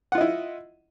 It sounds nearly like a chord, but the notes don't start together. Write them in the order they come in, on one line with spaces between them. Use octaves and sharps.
F#5 F4 D#5 E4